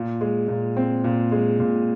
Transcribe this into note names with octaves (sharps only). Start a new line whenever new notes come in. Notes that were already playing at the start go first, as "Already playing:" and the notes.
Already playing: A#2
G#3
A#2
C4
A#2
G#3
A#2